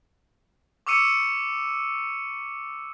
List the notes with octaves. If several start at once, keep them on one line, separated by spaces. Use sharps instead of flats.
C#6 D6 E6 C#7 D#7